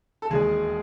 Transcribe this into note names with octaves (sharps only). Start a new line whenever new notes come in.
A4
E1 D#2 D#3 G#3 G#4